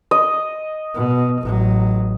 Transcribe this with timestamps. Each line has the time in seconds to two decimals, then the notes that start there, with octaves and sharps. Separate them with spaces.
0.11 D#5
0.94 B2
1.41 A1 F#3